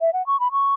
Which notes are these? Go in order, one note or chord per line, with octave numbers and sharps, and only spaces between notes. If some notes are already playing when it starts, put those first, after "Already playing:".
E5
F#5
C#6
B5
C#6